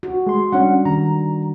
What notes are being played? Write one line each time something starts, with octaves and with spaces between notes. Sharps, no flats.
F#4
G#3 C6
G3 C#4 D4 F#5
D#3 A#5